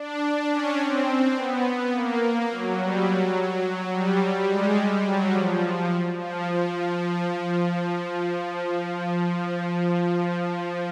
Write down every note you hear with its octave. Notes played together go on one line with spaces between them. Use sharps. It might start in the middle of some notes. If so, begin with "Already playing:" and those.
Already playing: D4
C#4
C4
B3
A#3
F#3
G3
F#3
F#3
G3
G3
G#3
G3
F#3
F3
F3